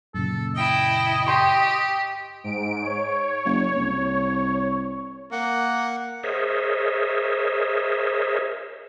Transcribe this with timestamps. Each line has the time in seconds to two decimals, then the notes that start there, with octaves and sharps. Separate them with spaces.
0.14 F#2 A#2 C#3 A4
0.56 E4 D#5 G5
1.27 G4 G5 C6 C#6
2.44 G#2 D7
2.82 C#5
3.45 F#1
3.76 C2
5.32 A#3 F#5
6.23 G#4 A#4 C5 C#5 D#5 E5